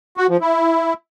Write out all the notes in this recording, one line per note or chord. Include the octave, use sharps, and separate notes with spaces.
F#4
F3
E4